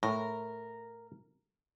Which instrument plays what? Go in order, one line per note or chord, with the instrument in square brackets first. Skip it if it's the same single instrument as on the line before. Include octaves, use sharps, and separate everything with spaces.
[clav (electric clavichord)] A2 [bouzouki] A#4